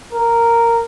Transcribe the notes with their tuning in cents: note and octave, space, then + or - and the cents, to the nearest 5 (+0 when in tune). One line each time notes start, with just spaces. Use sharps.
A#4 -5